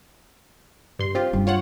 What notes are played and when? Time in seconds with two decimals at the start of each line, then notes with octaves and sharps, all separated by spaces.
0.99 G2 C6
1.15 C4 F4 G4
1.33 G2 C#4
1.47 F4 C#5 F#5